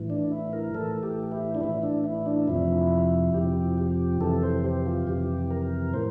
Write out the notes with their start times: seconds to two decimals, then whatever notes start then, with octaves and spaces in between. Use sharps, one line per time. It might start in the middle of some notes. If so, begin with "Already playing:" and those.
Already playing: A2 E3
0.10 D4
0.31 E4
0.53 A#4
0.74 A2 E3 A4
1.03 G4
1.32 E4
1.55 D4
1.61 A2 E3 E4
1.83 D4
2.04 E4
2.26 D4
2.48 F2 C3 F3 E4
3.34 F2 C3 F3 G4
3.78 G4
4.21 F2 C3 E3 A4
4.43 C5
4.64 G4
4.86 F4
5.07 F2 C3 E3 G4
5.51 A#4
5.94 A2 C5